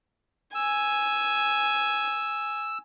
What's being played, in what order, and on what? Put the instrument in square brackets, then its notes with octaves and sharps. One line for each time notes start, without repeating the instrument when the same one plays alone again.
[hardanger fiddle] G#5 [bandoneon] E6